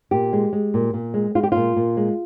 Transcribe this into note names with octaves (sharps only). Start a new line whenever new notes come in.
A#2 G4
G#3
G#3
A#2
A#2
G#3
G#3 F4
G4
A#2 F4
A#2
G#3